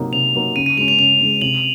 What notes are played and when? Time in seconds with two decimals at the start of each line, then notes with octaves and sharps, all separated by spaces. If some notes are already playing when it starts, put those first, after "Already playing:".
Already playing: C3 F#3 A#3 D#4
0.13 C3 F7
0.34 F#3 A#3 D#4
0.56 C#3 D#7
0.66 D#7
0.77 G#3 F7
0.81 C#4
0.88 F7
0.99 C#3 F7
1.21 G#3 C#4
1.42 C3 F#7